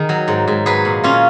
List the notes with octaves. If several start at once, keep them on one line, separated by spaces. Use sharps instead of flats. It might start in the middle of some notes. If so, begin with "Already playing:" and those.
Already playing: D#3 G#4
F#3
G#2
G#2
F#3 G#4 B4
A#2
A#2 C#4 F4